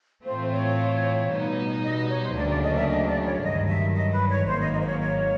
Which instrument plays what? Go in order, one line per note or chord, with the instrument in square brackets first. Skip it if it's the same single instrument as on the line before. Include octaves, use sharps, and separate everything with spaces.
[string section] A2 E3 A3 C4 F4 [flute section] C5
[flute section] C#5
[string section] B2 G3 B3 D#4
[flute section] D#5
D#5
C#5
C5
[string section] D2 C#3 F#3 A#3 D4 [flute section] D5
[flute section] D5
D#5
E5
D#5
D5
C#5
[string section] G2 D#3 F#3 [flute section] D#5
[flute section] E5
D#5
B4
C#5
[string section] G#1 G#2 D#3 F#3 A#3 [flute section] C5
[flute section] D#5
D#5
C5
C#5
C#5